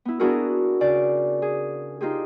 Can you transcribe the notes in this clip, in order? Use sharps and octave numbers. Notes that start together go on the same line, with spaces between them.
B3 E4
B3 D4 E4 F#4 G#4 A#4
C#3 D5
G#4
D#4 F4 G4 G#4